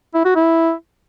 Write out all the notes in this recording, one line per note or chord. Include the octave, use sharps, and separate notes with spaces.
E4
F#4
E4